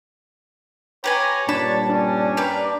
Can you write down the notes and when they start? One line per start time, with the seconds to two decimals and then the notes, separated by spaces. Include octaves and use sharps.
1.04 G4 B4 C#5 G#5 A#5
1.49 G2 A#2 G3 D4 A5 B5
1.89 C#4 D4
2.37 G4 A#4 B4